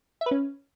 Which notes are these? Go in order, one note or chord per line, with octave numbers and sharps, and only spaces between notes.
E5
B4
C#4